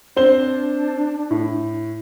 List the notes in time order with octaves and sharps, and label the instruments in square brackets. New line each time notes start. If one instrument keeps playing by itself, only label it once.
[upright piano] C4 C5 G7 [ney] D4
[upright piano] A2